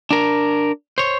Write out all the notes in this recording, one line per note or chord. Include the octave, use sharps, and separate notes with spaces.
D4 A#4
C5 C#5